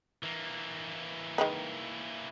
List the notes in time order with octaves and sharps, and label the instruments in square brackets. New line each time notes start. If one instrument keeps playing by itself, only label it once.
[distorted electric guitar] E3 A#3
[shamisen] D#3 G#3 B4